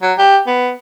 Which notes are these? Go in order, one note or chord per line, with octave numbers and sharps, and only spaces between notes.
F#3
G4
B3